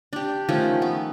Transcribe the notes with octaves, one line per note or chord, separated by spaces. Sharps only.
D4 G4
D#3 F3 A3 C#4
B3